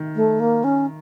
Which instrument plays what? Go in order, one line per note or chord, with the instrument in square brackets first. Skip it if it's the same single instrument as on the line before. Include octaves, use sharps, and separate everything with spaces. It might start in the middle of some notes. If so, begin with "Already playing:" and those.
Already playing: [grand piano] D#3
[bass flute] A3
A#3
C#4